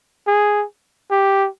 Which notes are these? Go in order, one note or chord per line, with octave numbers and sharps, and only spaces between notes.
G#4
G4